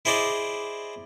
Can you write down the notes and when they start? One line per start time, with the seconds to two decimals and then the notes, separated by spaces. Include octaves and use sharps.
0.05 E4 G#4 C5 D5 D#5